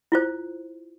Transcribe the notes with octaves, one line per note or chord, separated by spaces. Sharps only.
E4 F4 C5